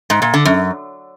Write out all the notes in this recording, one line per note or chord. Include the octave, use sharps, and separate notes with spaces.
G#2
A#2
D3
F#2